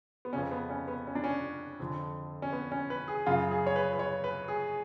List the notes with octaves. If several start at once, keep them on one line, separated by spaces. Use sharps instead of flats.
B3
F2 C#3 C#4
B3
C#4
B3
C#4
D4
C#4
F2 D3
C#4
B3
C#4
B4
G#4
F#2 C#3 F4
G#4
C#5
B4
B4
C#5
B4
G#4